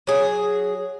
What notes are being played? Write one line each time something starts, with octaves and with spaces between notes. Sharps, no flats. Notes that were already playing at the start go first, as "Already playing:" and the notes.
F#3 G#4